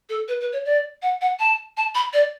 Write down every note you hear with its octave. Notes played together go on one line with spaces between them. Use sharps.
A4
B4
B4
C#5
D5
F#5
F#5
A5
A5
B5
D5